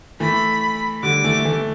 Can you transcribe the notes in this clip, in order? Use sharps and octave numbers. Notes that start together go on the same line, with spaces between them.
E3 A3 B5
D3 G3 D6
E3 A3
E3 A3